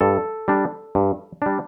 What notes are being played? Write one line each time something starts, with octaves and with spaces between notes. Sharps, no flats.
G2 A4
G3 D4
G2
G3 D4